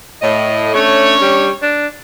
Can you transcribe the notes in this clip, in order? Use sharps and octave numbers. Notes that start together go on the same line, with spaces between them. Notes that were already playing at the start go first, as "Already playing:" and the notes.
A2 D#5
A3 C#4 D4 C#5
G3
D4